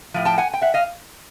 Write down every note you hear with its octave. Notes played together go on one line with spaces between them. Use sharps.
A2 F3
G5 A5
F#5 G#5
G5
E5 F#5
D#5 F5